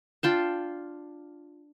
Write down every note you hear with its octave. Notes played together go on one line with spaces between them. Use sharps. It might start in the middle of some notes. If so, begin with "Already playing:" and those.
D4 F4 G5 A5